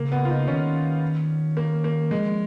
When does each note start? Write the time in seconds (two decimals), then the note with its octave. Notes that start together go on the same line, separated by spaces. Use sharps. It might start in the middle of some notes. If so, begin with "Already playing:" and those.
Already playing: C#3 A#3
0.12 B3
0.25 F4
0.29 D#4
0.47 D#3 C#4
1.57 A#3
1.84 A#3
2.11 F3 G#3